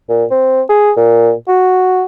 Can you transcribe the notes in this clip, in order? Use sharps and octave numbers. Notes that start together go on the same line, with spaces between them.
A#2
C4
G#4
A#2
F#4